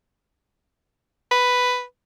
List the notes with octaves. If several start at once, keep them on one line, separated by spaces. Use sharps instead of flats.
B4